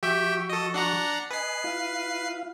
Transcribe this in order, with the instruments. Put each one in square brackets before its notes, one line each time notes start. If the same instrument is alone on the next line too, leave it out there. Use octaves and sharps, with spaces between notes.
[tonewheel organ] F3 F#4 C#6 [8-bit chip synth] G4 E5 G5
[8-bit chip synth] A4 D#5
D4 F#5 A#5
[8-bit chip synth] B4 C7 [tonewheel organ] D#5 G#5
[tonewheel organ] E4 F4 F5